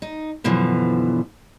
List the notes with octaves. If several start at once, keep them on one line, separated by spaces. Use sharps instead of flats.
D#4
F#2 B2 D3 E3 F3